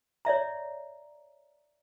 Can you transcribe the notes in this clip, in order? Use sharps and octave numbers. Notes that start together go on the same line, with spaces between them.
C#5 D5 E5 A#5